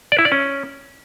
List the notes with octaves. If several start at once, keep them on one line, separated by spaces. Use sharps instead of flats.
D5
E4
D5
C#4